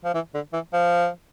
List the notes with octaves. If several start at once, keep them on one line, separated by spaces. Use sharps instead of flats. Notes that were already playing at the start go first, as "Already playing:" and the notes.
F3
E3
D3
E3
F3